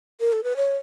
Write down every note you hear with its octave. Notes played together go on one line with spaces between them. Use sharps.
A#4
A4
B4
C#5